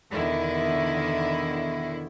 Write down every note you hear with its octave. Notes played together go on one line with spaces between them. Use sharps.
E2 B2 D3 D#3 E4